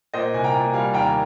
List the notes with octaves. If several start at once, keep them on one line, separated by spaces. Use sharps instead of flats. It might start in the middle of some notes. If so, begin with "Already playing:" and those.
A#2 C5 D#5
C2 G#5
G5 A#5
A#2
G3 F5 G#5
D#2 G5 A#5